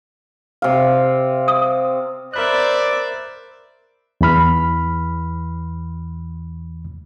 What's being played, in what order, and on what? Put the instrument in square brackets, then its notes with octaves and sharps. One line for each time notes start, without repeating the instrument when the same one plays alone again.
[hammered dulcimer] C3 F5
[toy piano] D#6
[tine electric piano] A#4 B5 F#6 [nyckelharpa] C5 E5 [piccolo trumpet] D5
[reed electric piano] E2 E3 B5 F6